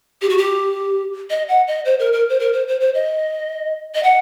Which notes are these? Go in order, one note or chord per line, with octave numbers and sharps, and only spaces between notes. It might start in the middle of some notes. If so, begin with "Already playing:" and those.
G4
F#4
G4
D#5
F#5
D#5
C5
A#4
A#4
C5
A#4
C5
C5
C5
D#5
D#5
F#5